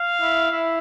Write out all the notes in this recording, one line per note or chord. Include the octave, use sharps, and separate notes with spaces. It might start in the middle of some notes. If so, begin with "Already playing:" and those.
Already playing: F5
E4
E4